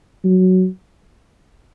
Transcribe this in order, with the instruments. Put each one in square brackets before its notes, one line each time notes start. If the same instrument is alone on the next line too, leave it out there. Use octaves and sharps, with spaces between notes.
[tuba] F#3